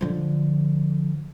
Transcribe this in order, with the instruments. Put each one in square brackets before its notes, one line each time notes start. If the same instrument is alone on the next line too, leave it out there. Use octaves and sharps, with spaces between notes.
[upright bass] D3 F3